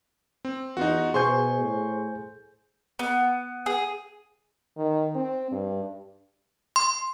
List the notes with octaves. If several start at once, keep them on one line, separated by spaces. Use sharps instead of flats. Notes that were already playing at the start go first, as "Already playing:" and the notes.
C4
E2 D#4 F4 F#4
B2 G#4 C5 G#5 C6 C#6 G6
A2
B3
G#4
D#3
C4
G2
C6